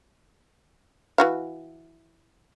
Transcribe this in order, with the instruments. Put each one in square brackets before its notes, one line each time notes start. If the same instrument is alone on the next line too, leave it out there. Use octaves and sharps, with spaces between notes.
[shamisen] E3 F#4 F5